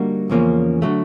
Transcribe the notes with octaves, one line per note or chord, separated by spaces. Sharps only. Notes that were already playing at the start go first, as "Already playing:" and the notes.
Already playing: D3 G3 A#3 D#4 F#4
E2 C#3 F3 A#3 C#4
D3 F#3 A3